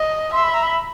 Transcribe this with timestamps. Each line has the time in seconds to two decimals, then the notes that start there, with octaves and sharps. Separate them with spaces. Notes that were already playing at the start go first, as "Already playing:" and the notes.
Already playing: D#5
0.33 E5 C6
0.43 B5
0.54 A#5
0.63 B5